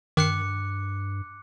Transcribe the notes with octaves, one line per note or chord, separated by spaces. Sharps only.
G2 D#3 D6 F#6 C#7